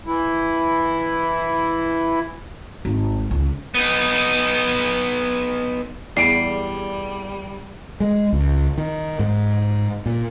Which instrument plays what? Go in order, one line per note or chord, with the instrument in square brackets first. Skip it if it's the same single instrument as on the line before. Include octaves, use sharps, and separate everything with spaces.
[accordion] E3 E4
[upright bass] G#1
C#2
[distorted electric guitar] B3 D#4
[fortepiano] E2 [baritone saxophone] G3 [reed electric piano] G4 G#4 D5 [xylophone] C7 D7
[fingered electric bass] G#3
C#2
D#3
G#2
A#2